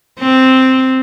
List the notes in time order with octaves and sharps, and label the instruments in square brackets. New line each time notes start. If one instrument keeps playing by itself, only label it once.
[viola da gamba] C4